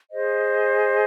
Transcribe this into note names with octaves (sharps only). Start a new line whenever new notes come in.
G#4 C5 D#5